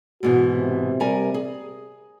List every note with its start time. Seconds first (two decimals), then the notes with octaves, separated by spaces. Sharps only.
0.23 G#2 B2 E3 F#4
0.55 C3
1.00 G3 A#4 G#5
1.34 G#4